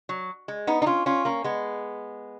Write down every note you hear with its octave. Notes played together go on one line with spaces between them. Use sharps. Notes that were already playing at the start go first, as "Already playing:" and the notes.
F#3
G#3
B3 D#4
D#4
C#4 F4
C#4 F4
A#3 C#4
G#3 B3